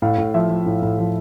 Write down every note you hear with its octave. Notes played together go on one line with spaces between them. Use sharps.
A2 F5
A2
F3 E5
F3
A2
A2
F3